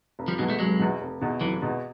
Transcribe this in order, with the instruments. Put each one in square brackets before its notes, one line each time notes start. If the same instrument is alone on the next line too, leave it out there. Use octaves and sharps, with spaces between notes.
[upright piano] F1
[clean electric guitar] F3 G3
[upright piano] E2 B2 [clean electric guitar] F#3 G#3
[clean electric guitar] G3 A3
[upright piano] F1 [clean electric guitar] F#3 G#3
[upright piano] E2 B2
F1
E2 B2
[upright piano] F1 [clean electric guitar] E3 F#3
[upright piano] E2 B2